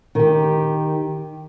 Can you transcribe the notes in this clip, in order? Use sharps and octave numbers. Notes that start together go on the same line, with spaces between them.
D#3 G4